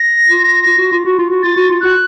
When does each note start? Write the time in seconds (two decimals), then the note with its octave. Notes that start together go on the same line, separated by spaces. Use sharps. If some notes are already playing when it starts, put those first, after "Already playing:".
Already playing: A#6
0.28 F4
0.66 F4
0.78 F#4
0.92 F4
1.05 F#4
1.18 F4
1.30 F#4
1.43 F4 A6
1.56 F#4
1.70 F4
1.81 F#4 F#6